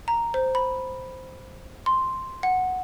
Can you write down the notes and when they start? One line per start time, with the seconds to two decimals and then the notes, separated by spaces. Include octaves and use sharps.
0.08 A#5
0.34 C5
0.55 B5
1.86 C6
2.43 F#5